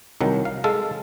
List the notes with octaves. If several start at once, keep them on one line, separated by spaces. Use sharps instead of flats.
C2 D#3 F#3
F5
G#3 A4 F5